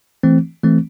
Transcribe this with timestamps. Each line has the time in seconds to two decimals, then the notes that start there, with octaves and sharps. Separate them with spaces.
0.23 E3 A3 C4
0.63 E3 A3 C4